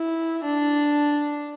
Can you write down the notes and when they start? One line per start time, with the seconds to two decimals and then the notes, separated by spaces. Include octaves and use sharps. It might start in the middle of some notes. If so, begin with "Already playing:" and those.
Already playing: E4
0.44 D4